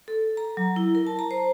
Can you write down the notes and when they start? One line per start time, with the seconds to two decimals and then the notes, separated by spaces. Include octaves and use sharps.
0.08 A4
0.37 A#5
0.57 F#3
0.76 E4
0.95 A#4
1.07 A5
1.19 A#5
1.31 C5